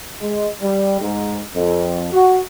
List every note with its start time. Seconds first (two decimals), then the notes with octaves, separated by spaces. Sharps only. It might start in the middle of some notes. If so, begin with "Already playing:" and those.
0.21 G#3
0.61 G3
1.01 G#2
1.54 F2
2.12 F#4